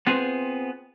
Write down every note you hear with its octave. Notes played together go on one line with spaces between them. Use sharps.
B3 C4 F4 G#4 B4 C5